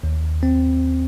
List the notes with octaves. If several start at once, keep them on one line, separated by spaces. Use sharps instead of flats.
D#2
C4